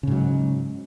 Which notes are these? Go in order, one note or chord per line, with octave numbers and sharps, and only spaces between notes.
G#2 C#3 F#3